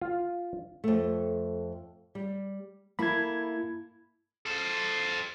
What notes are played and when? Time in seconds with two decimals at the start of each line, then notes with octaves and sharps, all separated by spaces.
0.01 F4
0.84 F2 A3
2.15 G3
2.99 A#3 E4 A4 B5 G#6
4.46 A4 C5